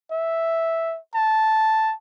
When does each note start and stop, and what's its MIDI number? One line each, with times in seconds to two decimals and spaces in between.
0.11 0.98 76
1.15 1.93 81